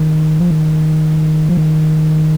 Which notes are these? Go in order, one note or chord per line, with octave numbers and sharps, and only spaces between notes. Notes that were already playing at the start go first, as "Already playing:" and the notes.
Already playing: D#3
F3
D#3
F3
D#3